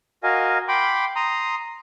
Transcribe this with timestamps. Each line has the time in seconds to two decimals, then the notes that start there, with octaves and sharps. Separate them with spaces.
0.23 F#4 A#4 D#5 F5 G#5
0.68 G5 B5 C6 D6
1.16 A#5 C6 D#6